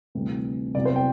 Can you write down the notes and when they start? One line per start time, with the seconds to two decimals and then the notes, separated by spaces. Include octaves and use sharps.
0.15 D2 C3 E3 G3
0.75 C2 C3 F#3 B3 D5
0.85 C5
0.96 G5